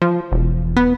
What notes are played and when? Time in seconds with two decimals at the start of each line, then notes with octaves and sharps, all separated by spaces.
0.02 F3
0.32 E1
0.77 B3